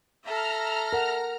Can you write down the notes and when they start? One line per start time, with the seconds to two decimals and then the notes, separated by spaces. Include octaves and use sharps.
0.24 A4 E5 A#5 F6
0.93 A#4 F#5